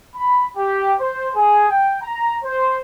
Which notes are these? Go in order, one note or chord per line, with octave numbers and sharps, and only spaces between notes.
B5
G4
C5
G#4
G5
A#5
C5